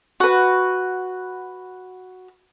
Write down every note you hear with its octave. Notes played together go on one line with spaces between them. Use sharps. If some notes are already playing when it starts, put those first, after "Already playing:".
F#4 B4